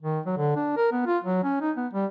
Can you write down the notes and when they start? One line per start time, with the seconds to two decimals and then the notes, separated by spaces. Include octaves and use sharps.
0.03 D#3
0.26 F#3
0.37 D3
0.56 D4
0.77 A#4
0.92 B3
1.07 F4
1.24 F#3
1.44 C#4
1.61 D#4
1.77 B3
1.93 G3